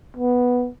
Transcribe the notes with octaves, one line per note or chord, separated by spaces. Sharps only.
B3